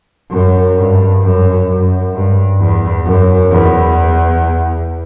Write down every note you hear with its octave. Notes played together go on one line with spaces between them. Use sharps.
F#2
G2
F#2
F#2
G2
E2
F#2
E2